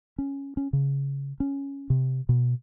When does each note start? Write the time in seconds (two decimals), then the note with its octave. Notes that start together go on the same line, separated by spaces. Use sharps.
0.18 C#4
0.57 C#4
0.73 C#3
1.40 C#4
1.90 C3
2.29 B2